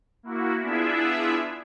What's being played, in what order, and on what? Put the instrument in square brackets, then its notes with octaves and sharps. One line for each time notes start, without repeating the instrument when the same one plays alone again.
[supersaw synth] A#3 E4 F#4
B3 D4 E4 F4 G#4 E5